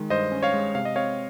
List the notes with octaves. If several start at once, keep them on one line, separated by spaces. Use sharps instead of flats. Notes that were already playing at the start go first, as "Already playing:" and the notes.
Already playing: D#3 G#3
G2 C5 D#5
C#4
C#5 F5
G#3
C3 F5
D#5
C4 C#5 F5